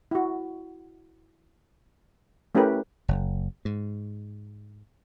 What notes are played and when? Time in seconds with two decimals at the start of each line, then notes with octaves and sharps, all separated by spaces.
0.11 E4 F#4
2.55 A3 C#4 E4 G4 A#4 B4
3.08 F#1
3.65 G#2